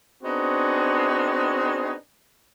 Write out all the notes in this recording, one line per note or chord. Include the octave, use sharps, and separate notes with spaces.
B3 C4 D4 D#4 F#4 G#4